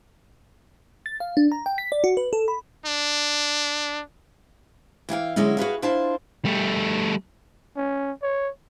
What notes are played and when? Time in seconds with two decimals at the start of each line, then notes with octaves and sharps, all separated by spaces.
1.06 A6
1.20 F5
1.37 D4
1.52 A#5
1.66 G5
1.78 B6
1.92 D5
2.04 F#4
2.17 B4
2.33 A4
2.48 B5
2.86 D4
5.09 E3 E4 F5 G5
5.36 D3 F#3 G#3 C#4 E4
5.57 F#4 G#4 B4 F5
5.82 D4 E4 F4 C5 F5 A5
6.45 G3 A3
7.77 C#4
8.22 C#5